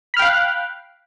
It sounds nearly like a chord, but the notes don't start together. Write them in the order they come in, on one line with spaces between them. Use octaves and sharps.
B5 F6 G5 F5 F#6